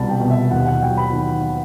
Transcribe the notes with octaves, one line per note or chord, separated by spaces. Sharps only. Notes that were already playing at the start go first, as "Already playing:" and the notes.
Already playing: C2 B2 A5 B5
G5
B2
E5
D#2 F#5
F#5
F#3 G5
B5
D#3